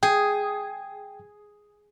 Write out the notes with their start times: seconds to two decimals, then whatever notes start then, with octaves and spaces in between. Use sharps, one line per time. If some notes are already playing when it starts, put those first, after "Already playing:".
0.03 G#4 G5